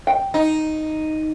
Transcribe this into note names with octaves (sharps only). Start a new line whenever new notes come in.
G5
D#4